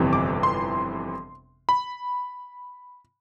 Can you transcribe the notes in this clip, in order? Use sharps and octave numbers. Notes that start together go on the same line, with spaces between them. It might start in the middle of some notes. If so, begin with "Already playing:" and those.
Already playing: G1 F2 C3 E3
D6
C6
B5